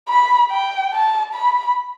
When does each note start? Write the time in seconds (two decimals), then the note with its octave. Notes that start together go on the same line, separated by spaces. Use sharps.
0.09 B5
0.51 G5
0.93 A5
1.34 B5